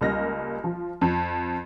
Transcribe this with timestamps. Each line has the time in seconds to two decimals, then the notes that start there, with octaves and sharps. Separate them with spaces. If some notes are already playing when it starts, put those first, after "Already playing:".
0.01 C#2 G3 A#3 D#5 F6 A#6
0.64 F3
1.01 F2